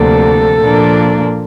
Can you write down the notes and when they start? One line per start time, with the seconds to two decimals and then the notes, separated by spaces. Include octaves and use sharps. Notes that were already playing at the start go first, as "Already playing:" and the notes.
Already playing: D2 C3 F3 A#3 D4 A4
0.60 A#2 F3 A#3 D4